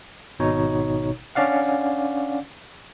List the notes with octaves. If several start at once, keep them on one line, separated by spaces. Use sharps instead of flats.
G#1 B2 D#4 C#5
C#4 D4 D5 F5 F#5